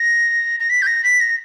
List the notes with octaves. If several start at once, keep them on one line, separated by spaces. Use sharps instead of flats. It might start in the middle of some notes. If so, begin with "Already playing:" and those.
Already playing: A#6
A#6
B6
G6
A#6
B6
A#6